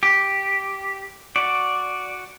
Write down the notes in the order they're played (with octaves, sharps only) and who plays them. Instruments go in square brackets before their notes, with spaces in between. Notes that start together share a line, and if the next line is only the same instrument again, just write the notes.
[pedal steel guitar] G4
F#4 D5